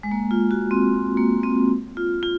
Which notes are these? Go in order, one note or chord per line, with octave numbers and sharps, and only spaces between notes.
G#3
A#3
F4
F#4
C4
A#3
C4
F4
F4